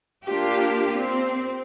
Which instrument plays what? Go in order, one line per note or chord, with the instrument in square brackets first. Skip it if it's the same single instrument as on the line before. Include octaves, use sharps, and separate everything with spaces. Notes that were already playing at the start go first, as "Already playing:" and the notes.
[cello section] A#3 D4 F4 G4
C4